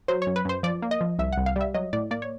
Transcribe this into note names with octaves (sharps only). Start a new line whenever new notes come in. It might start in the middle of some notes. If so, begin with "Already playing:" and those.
F#3 C5
F#2 C#5
B4
F#2 C5
F3 D5
A#3
D#5
F3
C2 E5
C2 F#5
F5
G3 E5
F#3 D#5
A2 D5
A#3 D5
C#5